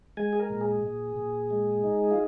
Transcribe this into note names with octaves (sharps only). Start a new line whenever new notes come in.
G#3 G#5
G#4
A#4
A#2
G#4
A#2
A#2
G#3
D#4
F4